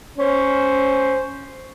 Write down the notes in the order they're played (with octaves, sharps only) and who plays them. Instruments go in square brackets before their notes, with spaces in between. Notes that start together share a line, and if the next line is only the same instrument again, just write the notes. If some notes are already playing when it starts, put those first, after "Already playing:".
[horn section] C#4 C5